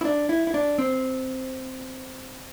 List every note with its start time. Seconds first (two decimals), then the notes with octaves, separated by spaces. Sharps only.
0.01 E4
0.05 D4
0.29 E4
0.47 E4
0.54 D4
0.78 C4